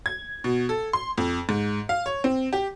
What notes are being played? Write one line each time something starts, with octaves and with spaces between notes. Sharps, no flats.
G#6
B2
A4
C6
F2
G#2
F5
C#5
C4
G4